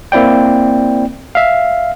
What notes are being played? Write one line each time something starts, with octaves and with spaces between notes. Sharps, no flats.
A#3 C4 E4 D5 G5
E5 F5